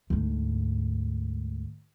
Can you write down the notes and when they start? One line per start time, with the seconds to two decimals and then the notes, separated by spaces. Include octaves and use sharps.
0.10 D2 G#2